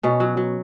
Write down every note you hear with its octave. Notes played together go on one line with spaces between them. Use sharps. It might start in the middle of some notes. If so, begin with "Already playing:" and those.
B2 C#4
F#3
F#3